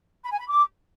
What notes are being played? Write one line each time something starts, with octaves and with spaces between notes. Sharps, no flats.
B5
G#5
B5
D6